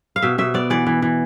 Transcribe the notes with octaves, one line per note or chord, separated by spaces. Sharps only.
F5
B2 E5
B2 E5
B3 D5
E3 D5
E3
E3